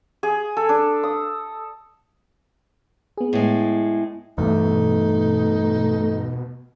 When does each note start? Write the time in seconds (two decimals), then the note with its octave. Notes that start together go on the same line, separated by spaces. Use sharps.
0.23 G#4
0.57 A4
0.69 D4
1.03 D#6
3.17 B3 G#4
3.33 A2 G#3
4.38 E2 G2 B2 A3 D#4